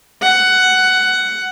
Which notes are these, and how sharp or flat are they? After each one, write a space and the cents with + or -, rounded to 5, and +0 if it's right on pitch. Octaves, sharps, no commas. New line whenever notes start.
F#5 +10